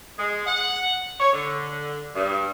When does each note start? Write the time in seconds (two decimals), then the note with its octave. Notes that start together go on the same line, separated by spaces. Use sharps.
0.19 G#3
0.47 F#5
1.20 C#5
1.33 D3
2.15 G2